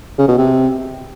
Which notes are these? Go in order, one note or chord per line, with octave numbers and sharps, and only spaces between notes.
C#3
B2
C3